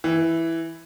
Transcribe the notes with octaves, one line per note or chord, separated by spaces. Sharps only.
E3